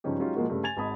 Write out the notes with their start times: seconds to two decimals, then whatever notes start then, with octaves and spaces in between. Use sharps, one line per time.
0.04 G2 C#3 F3 C#4 D#4 G4
0.18 F#3 G#3 C#4 D#4 F4 G4
0.35 A#2 F3 G#3 A#3 F4 F#4
0.50 G2 C#3 A3
0.64 G#5 G#6 A6 F7
0.77 G#1 G#2 A5 B5 D#6